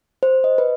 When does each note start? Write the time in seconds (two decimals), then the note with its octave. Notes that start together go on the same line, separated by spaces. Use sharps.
0.23 C5
0.44 D#5
0.58 B4